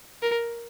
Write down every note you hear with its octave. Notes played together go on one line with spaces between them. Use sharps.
A#4